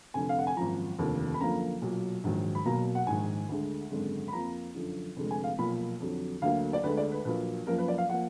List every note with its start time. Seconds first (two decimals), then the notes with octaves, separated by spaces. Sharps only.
0.14 F1 F2 D3 G#5
0.29 F5
0.39 F#5
0.47 G#5
0.57 G#1 F#2 F3 A#5
0.98 F1 D#2 D3 F3
1.34 B5
1.40 F#2 D3 F3 A#3 A#5
1.81 B1 A#2 F#3
2.24 A#1 G#2 D#3 F#3
2.55 B5
2.65 B1 B2 F#3 A#3 A#5
2.95 F#5
3.07 A#1 G#2 D#3 G#3 G#5
3.49 D2 D3 G#3
3.90 G#1 F#2 D3 G#3
4.28 B5
4.33 F2 F3 A#3 A#5
4.75 F#2 D3 F3
5.16 F1 F2 D3 G#3
5.31 G#5
5.44 F5
5.58 B1 A#2 F3 A#3 B5
6.00 F2 D3 F#3
6.42 D2 D3 F#3 A#3 F5
6.73 D5
6.84 D2 D3 G#3 B4
6.97 D5
7.12 B4
7.25 A#1 A#2 F#3 A#3 B4
7.67 F#2 F3 A#3 A#4
7.78 B4
7.88 D5
7.98 F5
8.09 F3 A#3 F#5